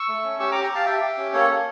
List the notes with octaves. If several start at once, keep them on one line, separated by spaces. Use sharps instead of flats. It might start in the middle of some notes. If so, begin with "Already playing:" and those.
Already playing: C#6 E6
A3
C#4
G4 C#6 E6
G4 A#5 D6
G5 A#5
G4 F5 A5
G4 E5 G5
G4
C#4
A#3 A4 C#5
A#3